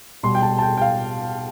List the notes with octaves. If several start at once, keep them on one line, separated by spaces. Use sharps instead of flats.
B2 G3 C6
G5
A5
A5
G5
G5
F5